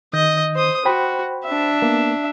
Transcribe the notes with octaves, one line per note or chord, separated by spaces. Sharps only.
D#3 D#5 G6
C5 D#6
F#4 C5 G5 B5
D4 E5
A#3 B3